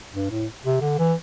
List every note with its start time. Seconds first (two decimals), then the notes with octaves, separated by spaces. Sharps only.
0.14 G2
0.31 A2
0.64 C3
0.81 D3
0.98 E3